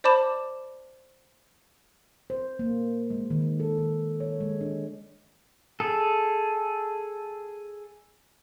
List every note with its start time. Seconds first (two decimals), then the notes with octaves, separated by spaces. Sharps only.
0.04 C5 D5 A5 B5 D6 E7
2.30 C5
2.59 A#3
3.10 G#3
3.30 D#3
3.60 A4
3.78 D#3
4.20 C#5
4.40 G#3
4.61 D4
5.80 G#4 A4